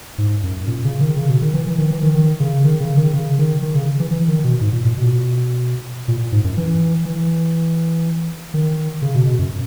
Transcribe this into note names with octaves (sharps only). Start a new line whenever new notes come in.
G#2
F#2
A#2
C#3
D#3
C#3
B2
D#3
E3
E3
D#3
E3
D#3
D#3
C#3
D#3
C#3
D#3
C#3
D#3
D#3
C#3
E3
E3
D#3
B2
G#2
A#2
A#2
B2
A#2
G#2
F#2
E3
E3
D#3
C#3
B2
B2
F#2